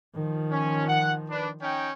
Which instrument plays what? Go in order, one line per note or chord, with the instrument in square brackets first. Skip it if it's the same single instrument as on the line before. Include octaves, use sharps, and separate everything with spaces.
[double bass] D#3 F3
[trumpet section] C#4
F#5
D4 B4
C#4 D#4 G5